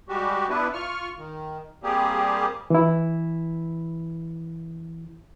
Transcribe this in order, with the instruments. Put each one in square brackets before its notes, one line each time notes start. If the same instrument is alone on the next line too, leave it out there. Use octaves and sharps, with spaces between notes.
[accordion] G3 G#3 F#4 G4
B3 D4 E4 B4
F4 C#6 F6
D#3
G3 A#3 C4 G4 G#4
[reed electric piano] E3 E4